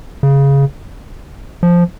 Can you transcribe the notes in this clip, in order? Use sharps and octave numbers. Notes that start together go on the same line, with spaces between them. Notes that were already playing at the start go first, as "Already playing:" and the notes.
C#3
F3